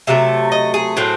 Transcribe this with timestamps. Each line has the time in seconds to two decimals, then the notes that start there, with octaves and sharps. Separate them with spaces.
0.07 C3 F#3 A3 E5
0.52 D#5
0.74 G#4
0.97 A2 F#3 C4